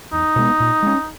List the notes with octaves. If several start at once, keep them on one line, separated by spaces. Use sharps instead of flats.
E2 D#4
B2 G#3 B3
A#2
G#3 C#4